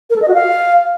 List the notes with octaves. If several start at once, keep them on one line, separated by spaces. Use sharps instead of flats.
A#4
A4
D#5
F#4
F5